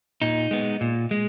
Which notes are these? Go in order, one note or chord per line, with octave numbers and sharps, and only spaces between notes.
A#2 D#4
G#3 B3
A#2
G#3